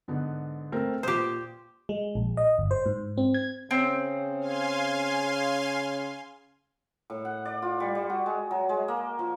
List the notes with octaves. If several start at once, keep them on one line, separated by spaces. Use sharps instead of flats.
G#2 D3 B3
A3 C4 A#4
A#2 G4 C5 D#6
G#3
A#1
D#5
G1
C5
G#2
C4
G#6
C#3 C4
F5 G#5 C6
A2
F#5
D5
F4
G3
G3
F#4
G#3
F#3
G#3
A#3
F3